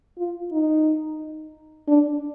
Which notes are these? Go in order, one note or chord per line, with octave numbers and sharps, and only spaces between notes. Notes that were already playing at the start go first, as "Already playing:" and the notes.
F4
D#4
D4